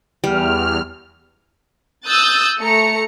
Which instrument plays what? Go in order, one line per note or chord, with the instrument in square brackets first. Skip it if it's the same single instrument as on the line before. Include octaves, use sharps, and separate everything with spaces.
[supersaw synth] E2 F6 [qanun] G3
[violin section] D#6 E6 F#6 G6 A6
A3 A#5 C#7